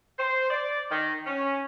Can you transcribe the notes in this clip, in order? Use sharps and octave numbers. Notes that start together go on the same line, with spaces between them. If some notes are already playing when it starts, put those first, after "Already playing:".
C5
D5
D#3
C#4